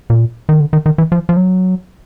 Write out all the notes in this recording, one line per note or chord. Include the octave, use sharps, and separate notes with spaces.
A#2
D#3
D3
D#3
D#3
E3
F3
F3
F#3